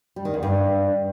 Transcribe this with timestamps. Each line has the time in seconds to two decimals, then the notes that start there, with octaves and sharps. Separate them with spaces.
0.16 G3
0.25 D#3
0.34 E2
0.43 G2